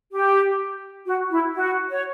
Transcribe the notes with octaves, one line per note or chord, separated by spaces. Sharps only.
G4
F#4
E4
F#4
C#5